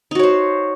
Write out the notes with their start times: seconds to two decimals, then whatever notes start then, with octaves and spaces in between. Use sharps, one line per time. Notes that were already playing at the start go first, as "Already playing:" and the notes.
0.11 D#4
0.15 F#4
0.19 C#5
0.23 C5